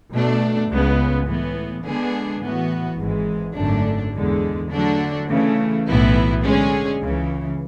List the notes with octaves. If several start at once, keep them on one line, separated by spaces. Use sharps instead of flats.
B2 A3 D4
C#2 C#3 G#3 B3
A2 E3 B3
D3 G#3 B3 D4 G#4
A2 E3 B3 F#4
G#1 G#2 E3 G#3
G#1 F#2 D3 A3 D4
E2 D3 G#3
D3 F#3 A3 D4 F#4
C#3 E3 A3
B1 A2 E3 B3 E4
D3 G#3 C#4 G#4
C#2 C#3 E3